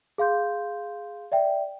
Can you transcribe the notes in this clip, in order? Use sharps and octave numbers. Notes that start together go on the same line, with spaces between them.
G#4 F5 C6 G6
D5 E5 G5